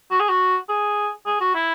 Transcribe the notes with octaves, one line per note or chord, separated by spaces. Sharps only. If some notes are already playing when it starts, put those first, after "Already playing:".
F#4
G#4
F#4
G#4
G#4
F#4
E4